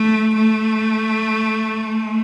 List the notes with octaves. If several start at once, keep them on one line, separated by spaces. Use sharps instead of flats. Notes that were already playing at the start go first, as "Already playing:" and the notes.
Already playing: A3
A3